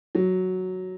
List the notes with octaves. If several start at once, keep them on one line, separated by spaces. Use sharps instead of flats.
F#3